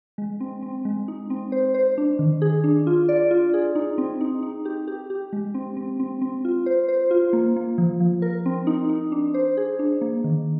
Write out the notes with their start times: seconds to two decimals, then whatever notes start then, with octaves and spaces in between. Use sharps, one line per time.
0.18 G#3
0.40 C4
0.62 C4
0.85 G#3
1.08 D#4
1.30 C4
1.52 C5
1.74 C5
1.98 D4
2.19 D#3
2.42 G#4
2.64 D4
2.87 F4
3.09 D5
3.31 F4
3.54 G#4
3.75 D#4
3.98 C4
4.21 D#4
4.43 D#4
4.65 G4
4.88 G4
5.10 G4
5.33 G#3
5.54 C4
5.77 C4
6.00 C4
6.21 C4
6.45 F4
6.66 C5
6.88 C5
7.11 F4
7.33 A#3
7.56 A#3
7.78 F3
8.00 F3
8.22 A#4
8.46 C4
8.67 D#4
8.89 D#4
9.12 D4
9.34 C5
9.57 G#4
9.79 D4
10.01 A#3
10.24 D#3